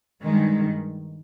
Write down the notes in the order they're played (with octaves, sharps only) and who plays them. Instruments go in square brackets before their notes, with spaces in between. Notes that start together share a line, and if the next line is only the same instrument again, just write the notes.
[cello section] G2 D#3 G#3